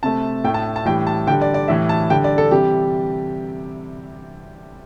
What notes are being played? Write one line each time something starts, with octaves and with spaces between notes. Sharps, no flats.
C3 A3 A5
A2 A3 G5
A5
A5
A2 E3 G3 G5
A5
D3 G3 G5
D5
D5
A2 E3 G3 E5
A5
D3 G3 G5
D5
A4
C3 E3 G3 G4